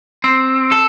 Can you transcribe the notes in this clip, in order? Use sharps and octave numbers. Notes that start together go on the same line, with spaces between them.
C4
A4